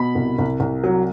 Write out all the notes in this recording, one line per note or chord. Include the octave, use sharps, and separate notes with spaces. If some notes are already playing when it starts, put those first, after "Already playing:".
Already playing: B2 B5
C2
C2
C2
F#3